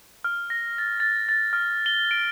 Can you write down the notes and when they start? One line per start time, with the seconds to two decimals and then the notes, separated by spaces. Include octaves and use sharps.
0.24 F6
0.50 A#6
0.78 A6
1.00 A6
1.29 A6
1.53 F6
1.86 G7
2.11 D7